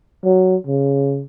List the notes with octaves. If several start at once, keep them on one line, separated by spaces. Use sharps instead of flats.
F#3
C#3